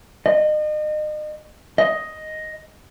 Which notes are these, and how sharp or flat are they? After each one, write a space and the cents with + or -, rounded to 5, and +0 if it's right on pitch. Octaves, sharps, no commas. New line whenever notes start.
D#5 -35
D#5 +5